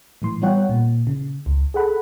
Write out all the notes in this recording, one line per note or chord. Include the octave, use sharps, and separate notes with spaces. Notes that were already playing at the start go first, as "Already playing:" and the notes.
A2 E3 C6
G3 B3 F4 C#5 F#5 G5
A#2
C#3
C#2
G#4 A4 F#5 B5